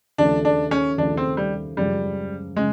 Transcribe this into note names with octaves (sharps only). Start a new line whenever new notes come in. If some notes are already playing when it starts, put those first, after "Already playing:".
D#2 C#3 F3 A3 D4
D4
C#4
D#2 C#3 F3 A3 D4
C4
G3
F#2 C#3 F3 G3 G#3
C#3 G#3